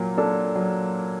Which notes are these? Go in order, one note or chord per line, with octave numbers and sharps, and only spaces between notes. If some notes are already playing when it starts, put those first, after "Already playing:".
Already playing: A#2 F#3 A#3
D4 A4
F#3